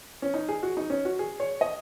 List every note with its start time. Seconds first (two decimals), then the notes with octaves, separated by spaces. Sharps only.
0.22 C#4
0.34 D#4
0.49 G#4
0.63 F#4
0.77 D#4
0.90 C#4
1.05 F#4
1.19 G#4
1.40 C#5
1.61 D#5